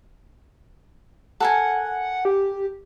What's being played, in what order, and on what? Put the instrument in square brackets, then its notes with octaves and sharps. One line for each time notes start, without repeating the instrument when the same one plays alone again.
[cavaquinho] A4 A#4 G#5 [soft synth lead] F#5
[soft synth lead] G4